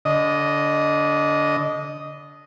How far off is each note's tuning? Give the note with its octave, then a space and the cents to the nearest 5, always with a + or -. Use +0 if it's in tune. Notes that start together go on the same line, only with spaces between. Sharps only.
D3 -25 D#5 +0